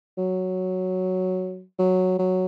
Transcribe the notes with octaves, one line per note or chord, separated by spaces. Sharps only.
F#3
F#3
F#3